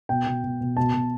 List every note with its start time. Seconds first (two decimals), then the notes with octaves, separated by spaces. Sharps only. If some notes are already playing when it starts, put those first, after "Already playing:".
0.09 B2 G5
0.26 B2
0.44 B2
0.61 B2
0.77 B2 A5
0.93 B2